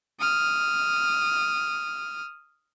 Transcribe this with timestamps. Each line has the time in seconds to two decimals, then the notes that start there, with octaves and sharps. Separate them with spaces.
0.20 D#6 F6